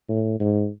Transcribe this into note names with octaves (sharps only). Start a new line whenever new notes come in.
A2
G#2